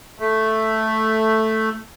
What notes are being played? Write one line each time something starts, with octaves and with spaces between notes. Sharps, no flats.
A3